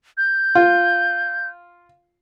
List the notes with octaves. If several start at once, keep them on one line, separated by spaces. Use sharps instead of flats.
G6
F4